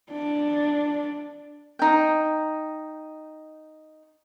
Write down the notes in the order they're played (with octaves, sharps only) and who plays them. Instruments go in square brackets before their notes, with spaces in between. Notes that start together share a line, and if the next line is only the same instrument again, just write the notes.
[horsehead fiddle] D4
[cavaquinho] D#4 G5